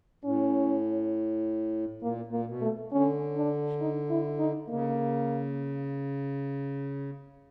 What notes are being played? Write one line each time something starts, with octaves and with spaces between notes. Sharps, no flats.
A2 C#4
A#2 A#3
A#2
A#3
B2
A3
D3 C#4
D4
D#4
E4
D#4
C#3 A#3